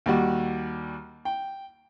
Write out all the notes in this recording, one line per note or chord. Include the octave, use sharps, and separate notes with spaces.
D#2 G3 F#4
G5